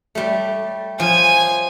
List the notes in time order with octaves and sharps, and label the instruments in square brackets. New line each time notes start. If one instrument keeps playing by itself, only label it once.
[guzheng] G3 A3
[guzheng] F3 [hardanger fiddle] G#5